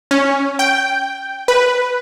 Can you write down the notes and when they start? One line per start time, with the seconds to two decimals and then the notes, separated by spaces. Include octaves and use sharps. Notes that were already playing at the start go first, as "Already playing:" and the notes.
0.11 C#4
0.59 G5
1.48 B4